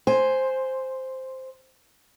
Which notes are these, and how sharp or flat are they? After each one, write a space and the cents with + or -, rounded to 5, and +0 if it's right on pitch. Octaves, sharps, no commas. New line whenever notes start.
C5 +0 G#5 +0